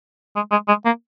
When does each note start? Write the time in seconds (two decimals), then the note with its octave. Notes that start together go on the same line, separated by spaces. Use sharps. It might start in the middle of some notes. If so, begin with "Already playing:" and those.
0.35 G#3
0.51 G#3
0.68 G#3
0.85 A#3